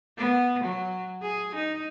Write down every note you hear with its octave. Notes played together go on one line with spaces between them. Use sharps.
B3
F#3
G#4
D#4